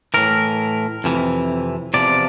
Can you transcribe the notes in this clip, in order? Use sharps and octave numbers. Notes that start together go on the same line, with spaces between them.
A2 E3 A#4
F2 C3 E3
E2 C3 F3 D5